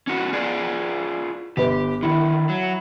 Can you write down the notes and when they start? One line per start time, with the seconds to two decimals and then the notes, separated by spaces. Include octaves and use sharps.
0.07 C#4 D#4 F#4
0.33 F4 G#4 D5
1.57 G1 G4 B4
2.03 D3 D#3 E4
2.49 F#3